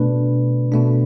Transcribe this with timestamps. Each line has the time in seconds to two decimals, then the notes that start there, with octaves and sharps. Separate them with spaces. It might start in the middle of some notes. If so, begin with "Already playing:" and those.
Already playing: B2 A3 D4 B4
0.72 B2 A3 D4